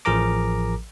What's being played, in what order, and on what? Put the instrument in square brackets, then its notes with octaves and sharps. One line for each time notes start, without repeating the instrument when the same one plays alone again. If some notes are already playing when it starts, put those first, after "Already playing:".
[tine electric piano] A1 F3 G#4 A#4 A#5 D6